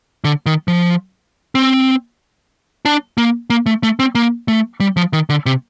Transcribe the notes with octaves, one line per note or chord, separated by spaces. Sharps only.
D3
D#3
F3
C4
D4
A#3
A#3
A3
A3
C4
A#3
A3
G3
F3
D#3
D3
C3